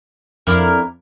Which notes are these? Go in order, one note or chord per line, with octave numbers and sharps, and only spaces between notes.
F2 D4 E4 A#4